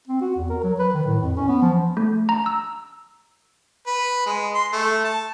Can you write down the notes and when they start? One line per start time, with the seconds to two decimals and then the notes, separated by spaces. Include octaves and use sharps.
0.07 C4
0.21 F#4
0.36 E2
0.50 A#4
0.64 F#3
0.79 B4
0.94 D#3
1.06 A2
1.21 F2
1.37 C#4
1.48 B3
1.62 F3
1.97 A3
2.29 A#5
2.46 E6
3.87 B4
4.26 G#3
4.55 C6
4.73 A3
5.05 A5